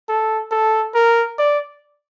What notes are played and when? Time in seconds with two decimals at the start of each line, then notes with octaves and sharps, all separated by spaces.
0.09 A4
0.51 A4
0.95 A#4
1.38 D5